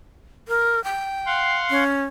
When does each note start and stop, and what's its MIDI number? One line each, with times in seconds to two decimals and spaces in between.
0.48 0.82 70
0.84 1.58 79
1.26 1.84 77
1.26 1.84 78
1.26 1.84 84
1.70 2.04 61